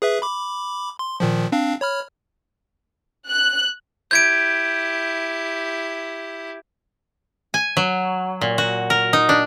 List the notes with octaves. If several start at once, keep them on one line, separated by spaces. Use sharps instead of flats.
G#4 B4 E5
B5 D6
C6
A#2 D#3 F3
C4 D4 F5
C#5 B5 F6
F#6
E4 G4 G6 G#6 D7
G#5
F#3
A#2
F#4
A#4
D#4
D4